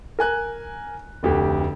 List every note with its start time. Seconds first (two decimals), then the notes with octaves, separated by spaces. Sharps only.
0.19 A#4 G#5 F#6
1.23 F1 D2 G4